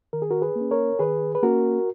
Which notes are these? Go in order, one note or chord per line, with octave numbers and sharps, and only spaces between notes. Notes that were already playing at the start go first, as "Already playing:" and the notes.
D#3 A#4
G#4
F#4 A#4
G#4 B4
A#3
C#4
A#4 C#5
D#3 G#4 B4
B4
A#3 C#4 F#4 A#4